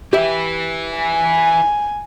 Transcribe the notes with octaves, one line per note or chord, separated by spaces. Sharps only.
E4 G4 B4 E5
G#5